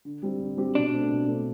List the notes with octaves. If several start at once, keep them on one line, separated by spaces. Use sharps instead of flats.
D3
G3 C4 G4
D3
G3 C4 G4
B2 D4
A3 C4
B2
A3 C4